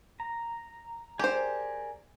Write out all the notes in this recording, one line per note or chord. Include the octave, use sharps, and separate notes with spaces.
A#5
G4 G#4 A#4 C5 D5